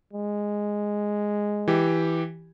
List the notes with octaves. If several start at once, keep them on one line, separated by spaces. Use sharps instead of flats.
G#3
E3 G4